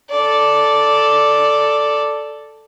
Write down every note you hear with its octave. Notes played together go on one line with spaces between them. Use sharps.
A4 D5